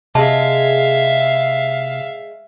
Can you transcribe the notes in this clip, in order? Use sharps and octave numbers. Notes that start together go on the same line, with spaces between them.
C3 G#3 E5 F5 A5